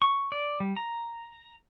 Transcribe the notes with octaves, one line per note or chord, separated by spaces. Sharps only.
C#6
D5
G3
A#5